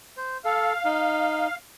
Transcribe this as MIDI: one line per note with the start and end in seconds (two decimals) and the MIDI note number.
0.17 0.38 72
0.45 0.73 69
0.45 1.56 77
0.85 1.47 63